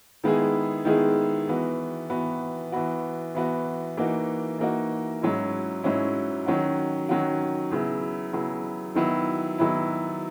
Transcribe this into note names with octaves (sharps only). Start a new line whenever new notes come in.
D#3 G#3 B3 E4 G#4
D#3 G#3 B3 E4 G#4
E3 B3 F#4
E3 B3 F#4
E3 B3 F#4
E3 B3 F#4
E3 A#3 D#4 F#4
E3 A#3 D#4 F#4
G#2 F#3 C#4 E4
G#2 F#3 C#4 E4
D#3 F#3 C#4 F#4
D#3 F#3 C#4 F#4
C#3 F#3 B3 E4
C#3 F#3 B3 E4
D#3 F#3 B3 E4
D#3 F#3 B3 E4